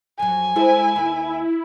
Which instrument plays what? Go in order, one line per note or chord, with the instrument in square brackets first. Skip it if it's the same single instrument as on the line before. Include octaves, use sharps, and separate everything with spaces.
[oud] F2 F#3 [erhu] G#5
[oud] G#3 A4 C5 [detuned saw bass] E4
[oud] D#2 B4